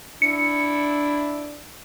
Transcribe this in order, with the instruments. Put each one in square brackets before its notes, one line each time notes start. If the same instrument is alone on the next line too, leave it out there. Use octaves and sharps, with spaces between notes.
[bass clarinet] D4 [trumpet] E4 [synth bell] C#7